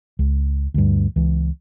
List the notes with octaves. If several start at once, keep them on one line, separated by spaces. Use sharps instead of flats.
C#2
D2 G2
C#2 E3